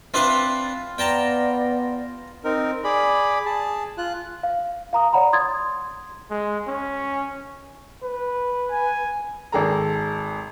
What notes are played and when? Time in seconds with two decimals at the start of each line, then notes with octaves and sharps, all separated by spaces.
0.14 C4 D4 F4 B4
0.98 B3 D5 G5 A5 A#5
2.44 C4 D#4 A#4
2.84 G#4 D5 B5
3.46 G#4 A5
3.98 F4 F#6
4.43 F5
4.93 F5 A#5 D#6
5.13 C#5 D5 F#5 A#5 B5
5.33 C6 D#6 G#6 A6
6.31 G#3
6.67 C#4
8.03 B4
8.72 G#5
9.52 G#1 G#4 A4 A#5